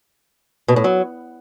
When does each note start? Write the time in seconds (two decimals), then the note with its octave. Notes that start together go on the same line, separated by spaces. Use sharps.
0.68 B2
0.76 A2
0.84 F#3